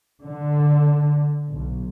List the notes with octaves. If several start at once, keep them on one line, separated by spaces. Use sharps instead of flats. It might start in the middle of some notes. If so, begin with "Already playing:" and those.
D3
B1